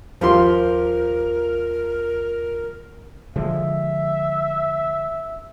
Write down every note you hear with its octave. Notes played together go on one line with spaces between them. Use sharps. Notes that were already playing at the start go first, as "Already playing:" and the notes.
D#2 F3 F4 G4 A#4 C6
D3 F3 G#3 E5